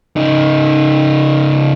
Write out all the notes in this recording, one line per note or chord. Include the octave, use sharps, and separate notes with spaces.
C#3 D#4